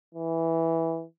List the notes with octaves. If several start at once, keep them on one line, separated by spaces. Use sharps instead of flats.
E3